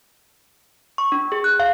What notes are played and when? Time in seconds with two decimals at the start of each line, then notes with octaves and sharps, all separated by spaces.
0.98 C#6
1.12 D4
1.32 G#4
1.44 F#6
1.60 F5